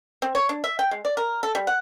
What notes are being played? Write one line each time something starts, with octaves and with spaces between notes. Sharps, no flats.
C4
C#5
D4
E5
G5
G#3
D5
A#4
A4
G3
F#5